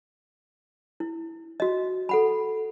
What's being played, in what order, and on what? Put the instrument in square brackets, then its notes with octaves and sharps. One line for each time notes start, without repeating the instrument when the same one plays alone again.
[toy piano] E4
F#4 D#5
A4 F#5 B5